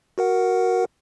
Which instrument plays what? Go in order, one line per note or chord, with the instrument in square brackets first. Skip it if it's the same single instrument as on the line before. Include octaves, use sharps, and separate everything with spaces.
[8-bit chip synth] F#4 A#4 F#5